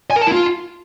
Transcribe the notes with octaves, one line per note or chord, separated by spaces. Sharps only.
G#5
A#4
A5
E4
F4